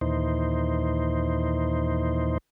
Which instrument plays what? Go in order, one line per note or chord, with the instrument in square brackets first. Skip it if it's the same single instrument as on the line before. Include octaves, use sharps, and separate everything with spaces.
[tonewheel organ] D#2 A#2 E3 D#4 C5